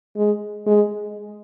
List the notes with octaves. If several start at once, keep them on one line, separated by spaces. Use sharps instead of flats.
G#3
G#3